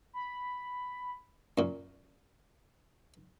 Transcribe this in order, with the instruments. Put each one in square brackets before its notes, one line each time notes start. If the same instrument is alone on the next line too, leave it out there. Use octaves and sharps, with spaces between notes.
[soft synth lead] B5
[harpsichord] F#2 A#2